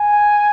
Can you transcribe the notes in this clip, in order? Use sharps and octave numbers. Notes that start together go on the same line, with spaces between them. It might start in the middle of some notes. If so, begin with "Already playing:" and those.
Already playing: G#5